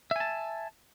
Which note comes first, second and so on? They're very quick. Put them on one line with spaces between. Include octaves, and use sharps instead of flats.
E5 G#5 A5